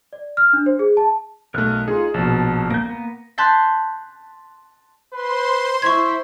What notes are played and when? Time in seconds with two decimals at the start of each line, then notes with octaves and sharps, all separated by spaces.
0.13 D5
0.37 F6
0.53 D4
0.66 C5
0.79 G#4
0.97 A5
1.54 B1 A3 A#4 F6 F#6
1.88 D#4 F4 G#4
2.14 A#1 B2 A5
2.70 A#3 G6 A#6
2.85 A#3 B3
3.38 A5 C6 F#6 G6 A6 B6
5.13 B4 C5 C6
5.82 E4 C5 C#6 G#6